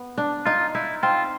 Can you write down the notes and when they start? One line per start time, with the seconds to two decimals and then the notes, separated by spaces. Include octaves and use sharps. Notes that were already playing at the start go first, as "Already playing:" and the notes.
Already playing: B3
0.18 D4
0.46 D#4 F4
0.75 D#4 E4
1.03 C4 F4